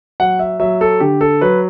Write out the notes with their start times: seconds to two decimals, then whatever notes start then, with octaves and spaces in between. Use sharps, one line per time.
0.20 F#3 F#5
0.39 E5
0.60 F#3 E5
0.81 A4
1.00 D3 G4
1.21 A4
1.41 F#3 B4